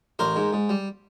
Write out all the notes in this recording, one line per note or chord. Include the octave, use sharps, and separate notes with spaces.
A1 A#4 C5
G#2
G#2
G3